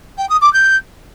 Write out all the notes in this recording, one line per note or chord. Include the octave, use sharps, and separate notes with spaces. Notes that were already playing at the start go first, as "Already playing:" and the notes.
G5
D#6
D6
G6